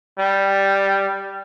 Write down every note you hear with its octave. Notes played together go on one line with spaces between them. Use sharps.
G3